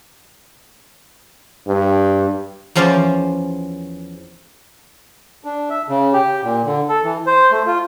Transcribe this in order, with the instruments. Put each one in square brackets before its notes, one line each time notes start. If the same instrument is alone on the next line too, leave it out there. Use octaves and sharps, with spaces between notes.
[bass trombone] G2
[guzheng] E2 F3 C#4 F4 C5 D5
[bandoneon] D4
E5
C#3
G4
A#2
D3
A4
E3
C5
A3
F4